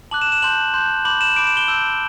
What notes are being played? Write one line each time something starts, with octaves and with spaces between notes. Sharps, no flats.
A5 D6 F#6 F#7
E7
E7
A5 C6 G6 F#7
A5 C6 G6
B5 D6 G6 F#7
E7
B5 D6 G6 D7
E7
G7
A5 E6 G6